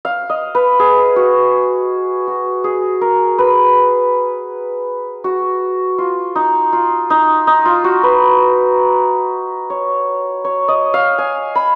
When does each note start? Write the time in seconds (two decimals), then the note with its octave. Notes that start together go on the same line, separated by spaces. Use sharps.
0.05 F5
0.30 D#5
0.55 B4
0.80 G#4
1.16 F#4
2.27 F#4
2.64 G#4
3.01 A#4
3.38 B4
5.24 F#4
5.98 F4
6.35 D#4
6.73 F4
7.10 D#4
7.47 D#4
7.65 F4
7.84 F#4
8.03 B4
9.70 C#5
10.45 C#5
10.68 D#5
10.94 F5
11.18 G#5
11.55 B5